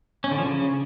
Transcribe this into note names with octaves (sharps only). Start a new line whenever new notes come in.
C#4
D3
F3
C#3